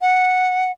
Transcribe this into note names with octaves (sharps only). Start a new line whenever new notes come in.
F#5